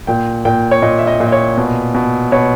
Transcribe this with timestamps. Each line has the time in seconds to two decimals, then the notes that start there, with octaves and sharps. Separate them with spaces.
0.07 A#2 G5
0.45 A#2 G5
0.71 C#5
0.82 A#2 D#5
0.99 E5
1.07 D#5
1.20 A#2
1.27 D#5
1.32 C#5
1.57 B2
1.94 B2
2.32 B2 C#5